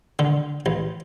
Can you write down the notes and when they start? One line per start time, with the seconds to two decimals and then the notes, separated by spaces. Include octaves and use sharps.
0.19 D3
0.66 A1